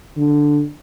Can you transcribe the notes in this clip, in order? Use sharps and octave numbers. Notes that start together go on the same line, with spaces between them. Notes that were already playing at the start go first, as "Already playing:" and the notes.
D3